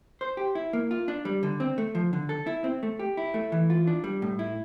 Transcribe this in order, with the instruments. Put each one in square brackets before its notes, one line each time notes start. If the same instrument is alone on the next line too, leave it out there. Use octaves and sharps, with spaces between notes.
[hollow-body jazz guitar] C5
G4
E4
A#3
F4
D4
G3
D3
C4
A3
F3
D3
A4
E4
C4
A3
G4
E4
A3
E3
F4
D4
G3
A2
E4